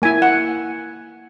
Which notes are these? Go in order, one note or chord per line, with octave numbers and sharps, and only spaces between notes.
A#3 E4 G#5
F#5